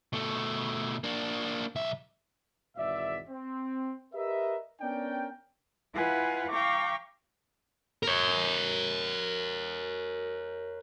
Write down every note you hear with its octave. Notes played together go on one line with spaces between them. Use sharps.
B2 A3
A#3 D4
B1 E5
G#1 E2 B2 D5 E5
C4
G4 A#4 B4 D#5 E5
B3 C#4 D4 A#4 D5 G5
E4 F4 B4 F5 F#5 G#5
F5 G5 A#5 C#6 D6
A#4 C#5